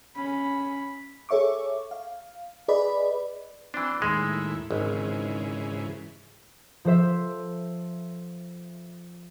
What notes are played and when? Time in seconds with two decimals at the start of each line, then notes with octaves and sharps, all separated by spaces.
0.16 C#4 B5
1.29 G#4 A4 C#5 E5 C#6 D6
1.91 F5
2.68 G#4 B4 D5 D#5 B5
3.74 E3 C4 D4
4.02 D#2 A2 G#3 E4
4.71 G#1 G#2 C#3 E3
6.85 F3 A4 C5 E5